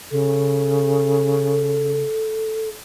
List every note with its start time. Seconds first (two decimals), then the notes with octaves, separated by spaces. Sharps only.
0.11 C#3 A4